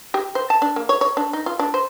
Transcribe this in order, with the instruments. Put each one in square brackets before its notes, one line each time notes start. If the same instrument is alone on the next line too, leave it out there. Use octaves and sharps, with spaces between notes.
[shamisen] G4
C5
A5
D4
A#3
C#5
C#5
D4
D#4
F4
D4
C5